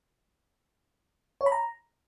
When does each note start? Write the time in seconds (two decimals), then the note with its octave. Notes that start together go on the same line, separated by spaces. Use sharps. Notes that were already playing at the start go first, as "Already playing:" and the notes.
1.41 C#5
1.46 B5
1.52 A#5